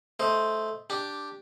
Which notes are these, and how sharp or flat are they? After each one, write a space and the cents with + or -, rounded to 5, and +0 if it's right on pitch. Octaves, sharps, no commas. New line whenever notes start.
A3 -10 C5 +0 D#5 +0
D4 +0 G4 +0